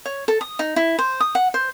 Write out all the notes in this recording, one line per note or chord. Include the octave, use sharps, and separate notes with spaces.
C#5
A4
D#6
D#4
E4
C5
D#6
F#5
C5